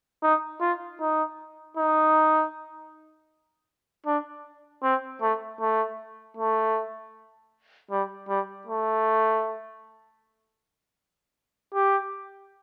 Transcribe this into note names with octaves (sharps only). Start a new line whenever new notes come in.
D#4
F4
D#4
D#4
D4
C4
A3
A3
A3
G3
G3
A3
G4